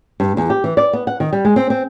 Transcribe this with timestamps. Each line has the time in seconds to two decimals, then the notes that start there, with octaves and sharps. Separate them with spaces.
0.20 G2
0.37 E2
0.50 G4
0.64 E3
0.77 D5
0.93 B3
1.07 F#5
1.20 D#3
1.33 G3
1.45 G#3
1.56 C4
1.70 C4